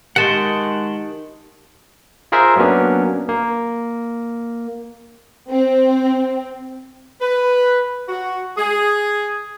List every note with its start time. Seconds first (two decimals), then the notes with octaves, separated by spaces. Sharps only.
0.16 D#3 G#3 G4 F#5 A5 C6 A6 D7
2.32 F4 G#4 A#4 C5 E5
2.57 F#3 A#3 B3 C#4 D4
3.29 A#3
5.50 C4
7.21 B4
8.09 F#4
8.57 G#4